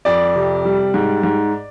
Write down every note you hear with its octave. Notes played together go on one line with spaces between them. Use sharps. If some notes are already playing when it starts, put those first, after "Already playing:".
F2 D5
C3
G3
G#2
G#2